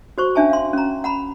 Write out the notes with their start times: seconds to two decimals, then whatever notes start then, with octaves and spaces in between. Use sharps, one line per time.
0.18 F#4 C5 C#6
0.35 C#4 D4 E5 G#5 A5
0.50 F5 C6
0.73 C#4 A#5
1.04 F#5 A#5 B5